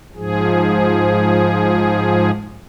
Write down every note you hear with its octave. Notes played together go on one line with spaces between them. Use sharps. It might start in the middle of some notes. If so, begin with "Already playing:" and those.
G#2 F3 G#4